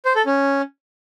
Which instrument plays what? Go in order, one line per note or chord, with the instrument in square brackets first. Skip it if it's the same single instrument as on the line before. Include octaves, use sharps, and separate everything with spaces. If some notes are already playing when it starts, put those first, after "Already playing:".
[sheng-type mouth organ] C5
A4
C#4